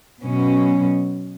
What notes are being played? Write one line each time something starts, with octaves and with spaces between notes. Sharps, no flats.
B2 F#3 C#4